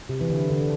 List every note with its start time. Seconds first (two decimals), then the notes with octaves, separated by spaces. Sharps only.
0.09 C3
0.21 E3
0.30 D3
0.50 D3